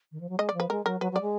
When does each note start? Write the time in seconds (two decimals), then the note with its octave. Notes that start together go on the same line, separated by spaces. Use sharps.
0.12 D#3
0.20 F3
0.29 F#3
0.38 G#3 D#5
0.49 D5
0.54 F3
0.60 B4
0.70 G#3 A#4
0.85 F#3 A#4
1.00 F#3 B4
1.12 F#3 D5
1.21 G#3